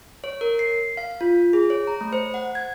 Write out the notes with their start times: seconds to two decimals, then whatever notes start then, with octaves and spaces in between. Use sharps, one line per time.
0.24 C#5
0.41 A#4
0.59 C7
0.97 F5
1.21 F4
1.53 G#4
1.70 C#5
1.87 A#5
2.01 A3
2.13 C5
2.34 F#5
2.55 G#6